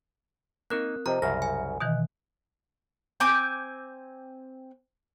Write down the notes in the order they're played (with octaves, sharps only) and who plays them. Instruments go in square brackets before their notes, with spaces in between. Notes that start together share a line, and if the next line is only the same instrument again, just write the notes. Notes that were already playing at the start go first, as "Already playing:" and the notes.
[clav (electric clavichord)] A#3 D#4 [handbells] C4 A#4 F#6
[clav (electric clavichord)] C3 F3 [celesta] G4 C5 D#5 [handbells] A#5
[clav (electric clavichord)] C2 F#2 C#3 [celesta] E5 F6 [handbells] A#6
[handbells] G#5
[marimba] B2 D#3 E3 [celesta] D#5 F#6
[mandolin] C4 G#5 D6 G6